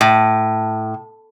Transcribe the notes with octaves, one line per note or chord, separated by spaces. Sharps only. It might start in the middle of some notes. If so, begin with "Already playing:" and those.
A2